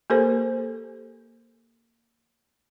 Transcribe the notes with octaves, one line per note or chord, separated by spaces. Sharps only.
A#3 G4 A4 A#4 C5